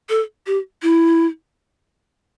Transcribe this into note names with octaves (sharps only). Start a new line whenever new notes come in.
A4
G4
E4